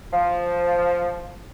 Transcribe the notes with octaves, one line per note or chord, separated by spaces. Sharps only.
F3